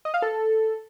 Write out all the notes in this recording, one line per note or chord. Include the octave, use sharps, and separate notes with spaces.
D#5
F5
A4